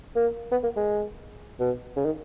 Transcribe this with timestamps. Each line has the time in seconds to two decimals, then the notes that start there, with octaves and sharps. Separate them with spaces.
0.16 A#3
0.52 B3
0.64 A#3
0.77 G#3
1.60 B2
1.97 C#3
2.05 D#3